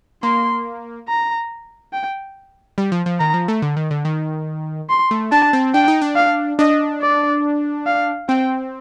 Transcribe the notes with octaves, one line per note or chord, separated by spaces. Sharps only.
A#3 C6
A#5
G5
G3
F3
F3
D#3 A#5
F3
A3
D3
D#3
D3
D#3
C6
A3
D4 A5
C4
D4 G5
D#4
D4
F5
D4 D#5
D5
F5
C4 G5